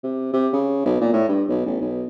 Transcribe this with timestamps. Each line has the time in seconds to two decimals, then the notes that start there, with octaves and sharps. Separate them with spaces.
0.03 C3
0.33 C3
0.53 C#3
0.85 B1
1.01 A#2
1.13 A2
1.29 G2
1.48 B1
1.66 A1
1.81 B1